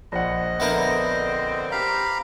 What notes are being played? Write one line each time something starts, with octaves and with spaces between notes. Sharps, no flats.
A#1 C5 D#5 F#5
D3 B3 C4 E4 A#4
C4 G4 F5 A#5 B5